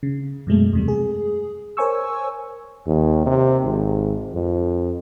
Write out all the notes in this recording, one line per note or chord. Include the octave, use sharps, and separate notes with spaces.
C#3
F#2 B2 G#3 A3
E2 C3 G3
G#4
A#4 C5 C#5 G#5 C#6 E6
D#2
C3
G#1
F2